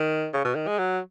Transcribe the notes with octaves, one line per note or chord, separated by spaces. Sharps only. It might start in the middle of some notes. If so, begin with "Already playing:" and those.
Already playing: D#3
C#3
B2
D#3
G#3
F#3